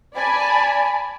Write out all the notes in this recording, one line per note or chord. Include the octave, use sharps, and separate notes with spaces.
D5 G#5 A5 B5